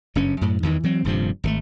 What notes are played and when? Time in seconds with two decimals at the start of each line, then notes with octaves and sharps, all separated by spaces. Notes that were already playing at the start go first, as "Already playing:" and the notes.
0.15 F#1 G2 C#4
0.41 F#2 A2
0.63 E2 G2 D#3 E3
0.83 E3 F#3 C4
1.04 D#1 G2 C3 F3
1.44 G#1 D3 A3